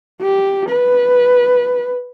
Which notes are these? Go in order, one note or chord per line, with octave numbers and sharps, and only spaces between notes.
G4
B4